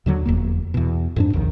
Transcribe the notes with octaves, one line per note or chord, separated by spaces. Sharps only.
D#2 D3 F#3
F1 E2 A#3
E2 B2
F2 G#2 D4
A#1 D#2 D#3